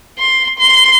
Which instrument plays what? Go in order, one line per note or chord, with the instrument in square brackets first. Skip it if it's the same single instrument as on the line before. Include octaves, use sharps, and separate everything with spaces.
[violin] C6
C6